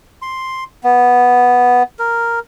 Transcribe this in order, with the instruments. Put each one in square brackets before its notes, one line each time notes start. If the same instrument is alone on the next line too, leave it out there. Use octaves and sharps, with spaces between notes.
[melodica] C6
B3
A#4